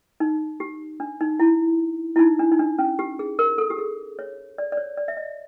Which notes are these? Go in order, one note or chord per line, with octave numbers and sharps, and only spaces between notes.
D#4
G4
D4
D#4
E4
E4
D#4
D4
D#4
D4
C#4
G4
G#4
A#4
A4
G4
G#4
C#5
D5
D5
C#5
D5
E5
D#5